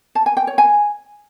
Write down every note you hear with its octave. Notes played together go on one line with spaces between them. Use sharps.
A5
G#5
G5
C#5
G#5